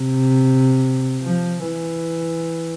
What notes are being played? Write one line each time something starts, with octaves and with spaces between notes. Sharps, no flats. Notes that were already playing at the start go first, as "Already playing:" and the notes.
Already playing: C3
F3
E3